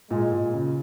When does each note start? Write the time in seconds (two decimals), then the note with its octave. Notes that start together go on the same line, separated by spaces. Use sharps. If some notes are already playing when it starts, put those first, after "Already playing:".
0.11 A#2 G#3
0.32 A#2
0.54 C#3